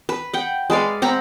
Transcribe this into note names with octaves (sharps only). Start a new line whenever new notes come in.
B4
F#5 G5
G#3 B4 D5 F5
C4 F#5 A#5 B5